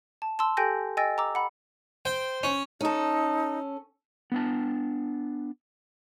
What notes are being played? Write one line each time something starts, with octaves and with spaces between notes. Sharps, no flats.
A5
A5 C6 E6
G4 A4 G5 G#5 G6 A#6
D#5 G5 G#5 E6 A6 A#6
A#5 D6 E6
F#5 B5
C5 G5
C#4
C#4 D#4 A4
B3 D4 A5